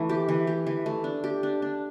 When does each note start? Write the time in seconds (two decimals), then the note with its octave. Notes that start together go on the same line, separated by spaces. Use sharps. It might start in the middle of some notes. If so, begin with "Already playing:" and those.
Already playing: E3 A3
0.09 G4
0.29 E3
0.47 G4
0.67 E3
0.86 A3
1.04 D4
1.24 G4
1.43 D4
1.62 D4